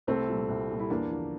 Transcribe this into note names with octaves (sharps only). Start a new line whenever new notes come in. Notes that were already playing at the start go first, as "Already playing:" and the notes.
C2 A3 C4
A#2 G3
C2
A#2 G3
E4
E2 A#3 D4
D3 F3